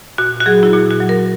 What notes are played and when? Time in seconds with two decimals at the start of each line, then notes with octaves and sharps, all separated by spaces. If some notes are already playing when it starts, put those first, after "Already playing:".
0.18 A#2 F#4
0.40 F#4
0.46 F#3 G#4
0.63 E4
0.73 A#2 F#4
0.91 F#4
1.00 F#3
1.09 A#4